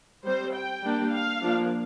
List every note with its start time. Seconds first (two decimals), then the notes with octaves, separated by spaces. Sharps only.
0.24 G3 C4 C5
0.53 G5
0.83 G3 A#3 D4
1.12 F5
1.41 F3 A#3 D4